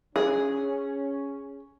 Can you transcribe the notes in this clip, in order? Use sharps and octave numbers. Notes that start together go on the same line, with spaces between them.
C#4 G#4